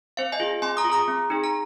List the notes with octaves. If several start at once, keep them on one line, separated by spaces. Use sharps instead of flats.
C4 C5 F5
D#5 G#5
F4 G#4
C4 G#5 C6
A#5 D#6
F4
G#4 A#5 D#6
C4
D#4 G#4
A#5